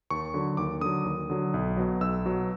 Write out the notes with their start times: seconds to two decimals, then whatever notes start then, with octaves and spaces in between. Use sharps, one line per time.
0.10 D#2 C#6
0.34 D3 F#3
0.57 D#2 D6
0.81 D3 F#3 D#6
1.05 D#2
1.30 D3 F#3
1.54 B1
1.77 B2 F#3
2.01 B1 E6
2.25 B2 F#3